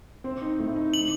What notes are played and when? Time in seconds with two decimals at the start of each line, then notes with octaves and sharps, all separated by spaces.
0.24 C4
0.41 D#4
0.59 A2
0.76 D#4
0.93 D3 F#7